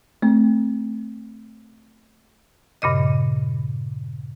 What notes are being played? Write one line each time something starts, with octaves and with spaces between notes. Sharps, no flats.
A3 C4
G2 A#2 C#3 D#5